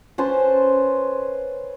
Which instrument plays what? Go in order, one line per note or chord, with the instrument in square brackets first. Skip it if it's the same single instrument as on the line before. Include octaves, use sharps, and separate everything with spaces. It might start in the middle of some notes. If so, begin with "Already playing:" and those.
[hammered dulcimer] C#4 B4 C5 A5